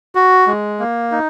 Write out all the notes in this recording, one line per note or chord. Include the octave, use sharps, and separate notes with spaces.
F#4
G#3
A#3
D#4